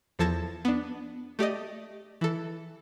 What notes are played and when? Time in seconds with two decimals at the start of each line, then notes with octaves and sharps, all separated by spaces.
0.19 E2 F3 A4 A5 G#6 A#6
0.65 B3 D4
1.39 A3 G4 D5 D#5
2.21 E3 A4